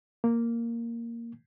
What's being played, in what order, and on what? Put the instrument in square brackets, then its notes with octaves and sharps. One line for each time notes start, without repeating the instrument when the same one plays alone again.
[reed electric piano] A#3